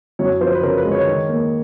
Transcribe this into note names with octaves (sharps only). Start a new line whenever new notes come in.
F#2 C#5
F3 C5
B4
C#3 A#4
B4
G#3
C#5
D#3
A#3